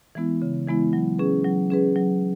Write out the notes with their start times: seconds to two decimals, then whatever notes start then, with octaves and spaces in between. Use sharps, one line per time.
0.15 E3 G#3 B3 E4
0.42 C#3
0.67 E3 G#3 B3 E4
0.93 F#3
1.19 C#4 G#4 B4
1.45 F#3
1.70 C#4 G#4 B4
1.96 F#3